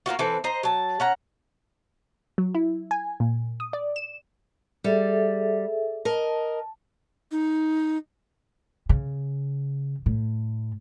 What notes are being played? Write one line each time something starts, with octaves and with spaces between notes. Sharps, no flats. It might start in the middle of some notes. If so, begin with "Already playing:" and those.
A#3 C4 F4 F#4
E3 C4 A4 B4
C5 D#5 A#5
F#3 A5
C#4 F#5 A#5
F#3
E4
G#5
A#2
D#6
D5
E7
G3 G#4 A4 E5
A#4 D#5 A5
D#4
C#3
A2